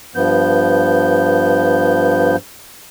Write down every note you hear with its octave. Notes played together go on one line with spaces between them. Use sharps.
G2 F3 B3 G6